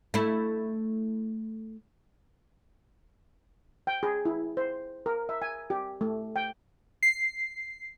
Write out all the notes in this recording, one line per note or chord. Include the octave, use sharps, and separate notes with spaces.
A3 E4
G5
G#4
E4
C5
A#4
E5
G#5
G4
A3
G5
C7